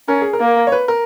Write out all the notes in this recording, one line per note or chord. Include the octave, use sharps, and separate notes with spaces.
C#4 A#4
G#4
A#4
A#3
C#5
B4
A#4